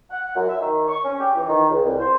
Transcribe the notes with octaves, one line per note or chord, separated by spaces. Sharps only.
F#5
F#2
E5
D#3
C#6
C#4
G4
E3
D#3
C#2
C2
C5